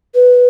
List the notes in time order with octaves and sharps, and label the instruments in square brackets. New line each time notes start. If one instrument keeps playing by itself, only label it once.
[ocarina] B4